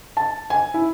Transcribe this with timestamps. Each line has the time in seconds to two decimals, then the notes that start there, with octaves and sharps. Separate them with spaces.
0.17 A5
0.50 G#5
0.74 E4